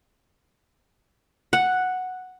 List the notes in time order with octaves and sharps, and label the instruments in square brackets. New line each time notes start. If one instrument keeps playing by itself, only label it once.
[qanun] F#5